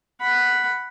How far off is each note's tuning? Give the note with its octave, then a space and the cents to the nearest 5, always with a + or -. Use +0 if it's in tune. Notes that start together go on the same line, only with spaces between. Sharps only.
F#5 +0 B5 +0